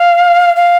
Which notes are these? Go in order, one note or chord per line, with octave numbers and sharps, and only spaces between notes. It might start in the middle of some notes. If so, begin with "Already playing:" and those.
Already playing: F5
F5